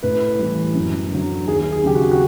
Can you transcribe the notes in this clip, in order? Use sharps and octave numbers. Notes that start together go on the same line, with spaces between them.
A2 B4
E3 G3
F#2
D3 F#3
D#2 G#4
G#4
C#3 F#3 G4
F#4
F#4